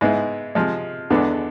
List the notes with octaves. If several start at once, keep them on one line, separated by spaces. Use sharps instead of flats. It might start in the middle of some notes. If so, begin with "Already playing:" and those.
G#2 G#3 B3 E4
C3 F3 G#3
E2 D3 G#3 B3 D4